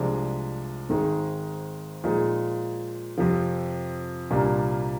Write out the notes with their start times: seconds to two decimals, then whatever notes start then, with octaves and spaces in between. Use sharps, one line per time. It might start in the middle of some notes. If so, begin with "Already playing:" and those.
Already playing: C2 C3 F3 G#3 D4
0.89 G#1 G#2 D#3 G#3 D#4
2.04 A#2 F3 G#3 D#4 G#4
3.18 F2 C3 F3
4.30 C2 A#2 G3 A#3 D4